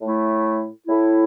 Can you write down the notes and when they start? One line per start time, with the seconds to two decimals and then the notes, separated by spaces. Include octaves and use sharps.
0.02 A2 A3 E4
0.87 A2 A3 E4